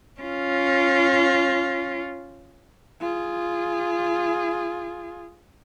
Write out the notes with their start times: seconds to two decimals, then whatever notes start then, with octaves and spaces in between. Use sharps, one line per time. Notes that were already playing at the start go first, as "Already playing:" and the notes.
0.21 C#4 F4
3.00 F4 G#4